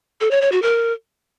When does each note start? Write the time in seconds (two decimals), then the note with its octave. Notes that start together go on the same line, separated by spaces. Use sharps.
0.21 A4
0.31 C#5
0.41 C#5
0.52 F#4
0.62 A#4